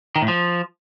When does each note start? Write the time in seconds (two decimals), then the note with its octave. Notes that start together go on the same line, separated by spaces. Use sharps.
0.16 D#3
0.22 A2
0.28 F3